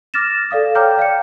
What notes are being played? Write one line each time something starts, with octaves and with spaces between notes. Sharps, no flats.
D6 F6 A6 A#6 E7
A4 D5 F5 D#6
C#5 G5 A#5 D6 F6 G6
D5 F5 G5 C#7